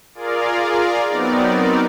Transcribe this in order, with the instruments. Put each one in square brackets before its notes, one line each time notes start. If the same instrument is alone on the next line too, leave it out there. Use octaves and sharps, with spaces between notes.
[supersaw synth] F4 G#4 A#4 D5 F5
F#3 B3 C4 D#4 A#4 D5